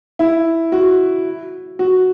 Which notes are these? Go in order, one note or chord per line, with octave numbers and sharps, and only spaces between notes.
E4
F#4
F#4